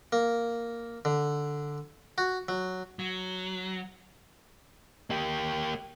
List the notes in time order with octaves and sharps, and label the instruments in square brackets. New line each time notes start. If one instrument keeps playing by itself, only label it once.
[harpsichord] A#3
D3
F#4
F#3
[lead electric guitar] F#3
A#3 G4